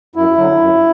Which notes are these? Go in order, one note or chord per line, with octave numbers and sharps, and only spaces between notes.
F#2 E4
D3 F#3
F#2